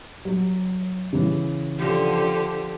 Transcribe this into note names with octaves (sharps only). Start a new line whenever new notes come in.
F#3
C#3 E3
D3 F3 G4